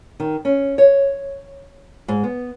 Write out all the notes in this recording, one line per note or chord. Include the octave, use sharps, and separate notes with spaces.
D#3
C#4
C#5
G#2
B3